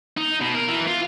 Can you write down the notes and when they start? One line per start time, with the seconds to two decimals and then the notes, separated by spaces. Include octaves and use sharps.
0.17 D#4
0.41 B2
0.55 A#4
0.69 E3
0.87 F4